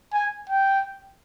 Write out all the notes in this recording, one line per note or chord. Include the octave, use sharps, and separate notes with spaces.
G#5
G5